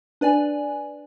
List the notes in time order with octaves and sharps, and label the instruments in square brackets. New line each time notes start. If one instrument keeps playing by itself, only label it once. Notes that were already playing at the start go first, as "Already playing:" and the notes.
[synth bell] D4 B4 D5 G#5